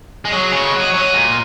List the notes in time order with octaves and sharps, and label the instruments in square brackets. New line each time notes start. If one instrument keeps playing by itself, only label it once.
[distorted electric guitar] G#3
[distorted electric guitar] F#3 [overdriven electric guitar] G#4
[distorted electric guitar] C#3 [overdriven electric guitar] C#5
[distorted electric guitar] G#3
F#3
[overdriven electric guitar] D#5
C#5
[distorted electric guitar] F#3 [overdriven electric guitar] D#5
[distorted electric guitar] A#2